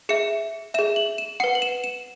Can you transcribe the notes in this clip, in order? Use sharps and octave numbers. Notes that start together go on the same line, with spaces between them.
G#4 E5 C#7
G#4 E5 E7
F#7
E7
B4 F#5 C#7
F#7
E7
E7